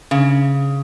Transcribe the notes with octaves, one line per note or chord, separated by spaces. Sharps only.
C#3